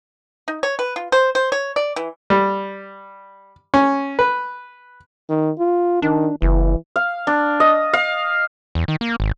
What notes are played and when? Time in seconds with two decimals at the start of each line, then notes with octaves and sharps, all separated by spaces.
0.48 D#4
0.63 C#5
0.79 B4
0.96 F4
1.12 C5
1.35 C5
1.52 C#5
1.76 D5
1.96 E3
2.30 G3
3.74 C#4
4.19 B4
5.30 D#3
5.59 F4
6.02 D#3 D4
6.42 F#1 E3
6.96 F5
7.27 D4
7.60 D#5
7.93 F5
8.75 E2
8.88 D#3
9.01 A#3
9.20 G#1